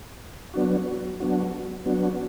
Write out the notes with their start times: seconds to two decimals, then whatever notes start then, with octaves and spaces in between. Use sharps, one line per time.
0.54 F#3 B3 D4 F#4
1.20 F#3 B3 D4 F#4
1.86 F#3 B3 D4 F#4